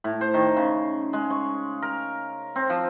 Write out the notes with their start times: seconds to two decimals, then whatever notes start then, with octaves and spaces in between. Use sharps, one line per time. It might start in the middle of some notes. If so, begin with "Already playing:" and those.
0.04 A2
0.21 C5
0.34 D#3
0.57 C#3
1.13 G#3
1.30 C#6
1.82 A#4
2.56 C4
2.70 F3